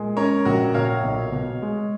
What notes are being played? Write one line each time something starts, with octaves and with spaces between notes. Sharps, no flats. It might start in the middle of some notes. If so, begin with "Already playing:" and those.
Already playing: A#2 G#3
C#4 A#4 C#5
A#1 F#4 A#4
A#2 C#5 F5
B1
B2
G#3